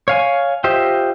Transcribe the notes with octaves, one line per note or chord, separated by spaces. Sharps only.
C#5 F5 G#5
F4 G4 C5 D#5 E5